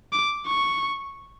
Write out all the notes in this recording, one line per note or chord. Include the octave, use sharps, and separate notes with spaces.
D6
C#6